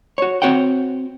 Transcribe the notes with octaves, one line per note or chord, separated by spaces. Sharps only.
F#4 C#5
C4 F#4 C#5 F#5 G5